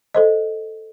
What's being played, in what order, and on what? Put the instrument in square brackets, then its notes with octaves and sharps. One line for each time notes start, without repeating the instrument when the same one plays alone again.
[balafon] A4 C5 D#5